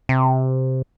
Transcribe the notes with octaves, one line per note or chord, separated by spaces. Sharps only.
C3